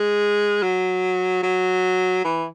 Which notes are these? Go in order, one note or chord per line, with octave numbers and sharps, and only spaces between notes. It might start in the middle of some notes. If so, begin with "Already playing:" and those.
Already playing: G#3
F#3
F#3
E3